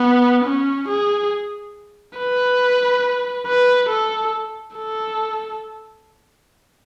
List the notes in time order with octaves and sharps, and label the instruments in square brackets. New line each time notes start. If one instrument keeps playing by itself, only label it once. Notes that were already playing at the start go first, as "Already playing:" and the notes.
Already playing: [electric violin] B3
C#4
G#4
B4
B4
A4
A4